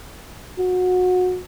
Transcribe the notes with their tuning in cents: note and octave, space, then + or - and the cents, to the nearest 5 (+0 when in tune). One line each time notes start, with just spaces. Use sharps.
F#4 -25